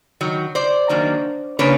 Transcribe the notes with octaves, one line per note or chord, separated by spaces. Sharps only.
D#3 F#3
C5 D5
D#3 F#3 A#3 D4
C#3 F3 A#3 D4 B4 C#5